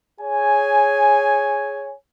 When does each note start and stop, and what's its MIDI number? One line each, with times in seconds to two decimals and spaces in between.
0.20 1.93 68
0.20 1.93 73
0.20 1.93 80